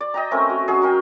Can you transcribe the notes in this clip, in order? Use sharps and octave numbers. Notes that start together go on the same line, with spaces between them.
D5
D#5 G5 A#5
A3 C4 C#4 A#4
F#4
F#3 C#4 G#4
F#4 A#4 G5